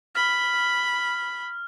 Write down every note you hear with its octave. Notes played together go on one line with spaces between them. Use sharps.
B5 F6